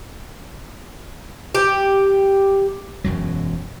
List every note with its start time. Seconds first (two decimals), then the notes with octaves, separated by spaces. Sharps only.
1.55 G4
3.04 E1 F#2 F#3